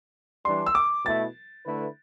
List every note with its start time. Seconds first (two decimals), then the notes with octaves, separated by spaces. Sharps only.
0.45 E3 G3 D4 C6
0.66 E6
0.75 D6
1.05 B2 A3 E4 A6
1.66 D3 A3 E4 B4